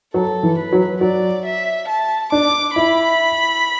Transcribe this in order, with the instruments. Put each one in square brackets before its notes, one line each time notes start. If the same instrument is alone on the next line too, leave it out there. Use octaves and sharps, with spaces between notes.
[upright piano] F#3 [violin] A4
[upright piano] E3
[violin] B4
[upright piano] F#3
[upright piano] F#3 [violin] D5
[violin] E5
A5
[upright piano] D4 [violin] D6
[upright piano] E4 [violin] B5